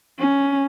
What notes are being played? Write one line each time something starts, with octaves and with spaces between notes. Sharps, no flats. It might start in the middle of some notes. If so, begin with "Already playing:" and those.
C#4